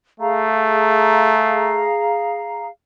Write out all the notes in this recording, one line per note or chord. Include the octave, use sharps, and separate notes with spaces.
A3 G#4 F5 A#5